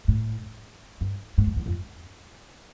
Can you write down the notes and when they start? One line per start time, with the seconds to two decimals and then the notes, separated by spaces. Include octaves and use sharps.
0.08 A2
1.01 G2
1.38 G#2
1.47 F#2
1.56 E2
1.66 F2